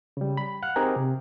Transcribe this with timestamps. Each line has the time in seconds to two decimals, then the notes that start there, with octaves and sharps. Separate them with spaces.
0.17 C#3 G3
0.37 B5
0.62 F5 F#5 F6 F#6
0.76 C4 D#4 G4 G#4 A#4
0.96 C3